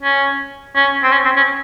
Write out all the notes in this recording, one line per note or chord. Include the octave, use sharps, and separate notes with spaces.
C#4
C#4
C4
C#4
C4
C#4